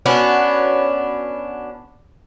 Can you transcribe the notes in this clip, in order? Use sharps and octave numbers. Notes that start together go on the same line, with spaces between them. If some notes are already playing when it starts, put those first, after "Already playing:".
B3 C#4 D4 F#4